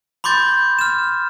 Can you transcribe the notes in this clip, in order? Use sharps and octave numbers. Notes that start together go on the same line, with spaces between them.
B5 C6 D6 G6 A6
F6 E7